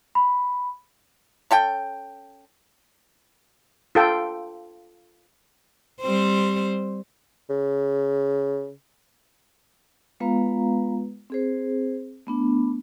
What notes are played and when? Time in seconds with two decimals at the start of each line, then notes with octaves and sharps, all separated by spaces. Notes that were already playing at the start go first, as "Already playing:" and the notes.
0.15 B5
1.51 C#4 A4 G5
3.95 F4 A4 G5
6.01 G3 C4 C5
7.50 C#3
10.20 G#3 B3 F4 B4 F5 A#5
11.30 C4 G#4 C5
12.27 A3 B3 D4